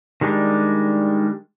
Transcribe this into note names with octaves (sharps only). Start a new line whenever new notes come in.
D#3 G3 G#3 D4